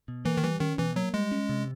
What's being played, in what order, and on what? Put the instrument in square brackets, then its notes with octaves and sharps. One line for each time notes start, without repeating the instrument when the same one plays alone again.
[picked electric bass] B2
[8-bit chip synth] E3 [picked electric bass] A#3
[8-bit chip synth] D#3
[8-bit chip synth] E3 [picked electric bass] G3
[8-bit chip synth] D#3 [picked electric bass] C#4
[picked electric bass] B2 [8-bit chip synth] E3
[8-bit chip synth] F#3 [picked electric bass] A#3
[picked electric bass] G3 [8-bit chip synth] G#3
[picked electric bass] C#4
C3